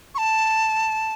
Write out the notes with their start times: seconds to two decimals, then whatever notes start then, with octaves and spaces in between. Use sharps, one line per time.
0.15 C#6
0.18 A5